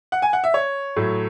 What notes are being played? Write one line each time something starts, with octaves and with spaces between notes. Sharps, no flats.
F#5
G#5
F#5
E5
C#5
A2 F#3 A3